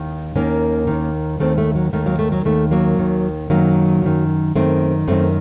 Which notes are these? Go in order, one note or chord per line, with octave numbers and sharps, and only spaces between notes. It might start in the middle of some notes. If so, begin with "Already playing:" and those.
Already playing: D#2 D#3
D#2 D#3 A#3 C#4
D#2 D#3
D#2 D#3 A3 C4
A3
F#3
D#2 D#3 A3
F#3 A#3
A3
F#3
D#2 D#3 A3
F#3 A#3
D#2 D#3
F#2 D#3 F#3 A#3
F#2 D#3
F#2 D#3 A3 C4
F#2 D#3 A3 C4